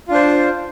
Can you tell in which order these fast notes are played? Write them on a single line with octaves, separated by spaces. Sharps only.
F4 D4 C5